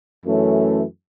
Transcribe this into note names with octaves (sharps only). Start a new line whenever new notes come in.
F#2 E3 A3 C#4